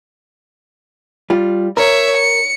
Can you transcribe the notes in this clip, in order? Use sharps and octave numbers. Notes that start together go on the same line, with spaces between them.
G3 F4
A#4 C#5 E5
C#7